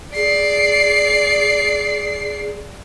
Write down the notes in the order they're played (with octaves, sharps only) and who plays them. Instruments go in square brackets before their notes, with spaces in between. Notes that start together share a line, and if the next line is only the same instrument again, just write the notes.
[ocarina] G#4 [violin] D5 C7